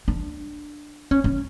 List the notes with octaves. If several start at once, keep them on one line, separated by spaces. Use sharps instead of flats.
D4
C#4
C#4